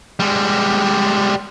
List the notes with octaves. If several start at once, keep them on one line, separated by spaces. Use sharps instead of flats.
G3 G#3